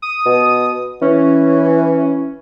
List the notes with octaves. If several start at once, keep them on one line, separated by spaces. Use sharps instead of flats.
D#6
B2
E3 C#4